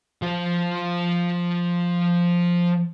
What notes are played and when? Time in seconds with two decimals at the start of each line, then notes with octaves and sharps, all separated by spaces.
0.22 F3 C5